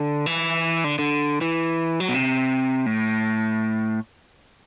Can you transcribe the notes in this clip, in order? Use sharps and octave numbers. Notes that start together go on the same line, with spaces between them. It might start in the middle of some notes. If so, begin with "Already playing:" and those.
Already playing: D3
E3
D3
D3
E3
F#3
B2
C3
A2